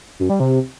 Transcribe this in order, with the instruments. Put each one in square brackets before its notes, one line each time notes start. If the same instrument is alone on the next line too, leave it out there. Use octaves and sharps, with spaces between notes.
[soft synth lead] F#2
G3
C3